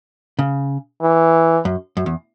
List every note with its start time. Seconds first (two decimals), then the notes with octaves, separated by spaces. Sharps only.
0.39 C#3
1.02 E3
1.65 F#2
1.97 F#2
2.06 E2